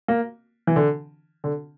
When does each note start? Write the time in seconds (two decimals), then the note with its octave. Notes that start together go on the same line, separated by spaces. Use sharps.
0.08 A#3
0.67 E3
0.76 D3
1.44 D3